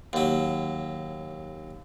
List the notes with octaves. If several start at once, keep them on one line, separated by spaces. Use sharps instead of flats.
D#2 F#3